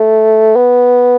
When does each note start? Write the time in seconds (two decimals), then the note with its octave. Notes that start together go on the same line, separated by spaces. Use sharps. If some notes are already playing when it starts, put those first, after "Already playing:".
Already playing: A3
0.56 B3